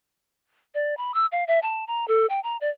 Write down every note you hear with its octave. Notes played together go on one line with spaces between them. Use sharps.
D5
B5
E6
F5
E5
A5
A#5
A4
G5
A#5
D5